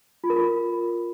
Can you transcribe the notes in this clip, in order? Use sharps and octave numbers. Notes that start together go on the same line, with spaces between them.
F4
A#4
F4